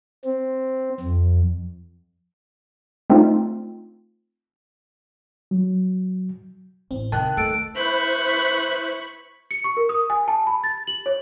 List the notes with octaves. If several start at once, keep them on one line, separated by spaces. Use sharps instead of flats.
C4
F2
A3 C4 D4 D#4 F4
F#3
A1 C4
C3 D#3 A5 F#6
A3 A4 D7
E4 B4 C5 B5 C#6
C#7
C#6
A#4
D#6
G#5
A5
B5
A6
F#7
C#5